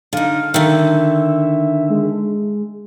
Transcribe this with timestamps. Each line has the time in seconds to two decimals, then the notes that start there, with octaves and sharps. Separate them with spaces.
0.13 D3 D#4 F5
0.54 D3 D#3 E5
1.90 G#3